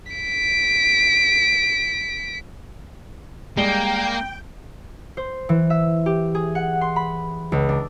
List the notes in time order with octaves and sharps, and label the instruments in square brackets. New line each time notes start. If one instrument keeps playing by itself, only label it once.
[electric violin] B6 D7
[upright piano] G3 G#3 G7 [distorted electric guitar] A#3 [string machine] G5
[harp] C5
E3
E5
G4
G#4
F#5
C6
B5
C#2
D4